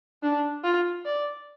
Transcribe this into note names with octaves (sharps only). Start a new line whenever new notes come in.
D4
F4
D5